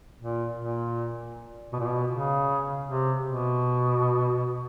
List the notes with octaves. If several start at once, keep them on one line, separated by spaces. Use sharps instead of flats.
A#2
A#2
B2
A#2
B2
C#3
C3
B2